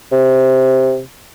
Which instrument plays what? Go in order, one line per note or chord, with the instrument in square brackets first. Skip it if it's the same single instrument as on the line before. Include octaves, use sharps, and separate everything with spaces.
[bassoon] C3